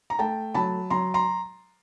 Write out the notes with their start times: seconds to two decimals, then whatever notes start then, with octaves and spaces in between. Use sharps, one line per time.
0.10 A#5
0.19 A3 G5 A5
0.54 F#3 A5 B5
0.90 F#3 A#5 C6
1.14 A#5 C6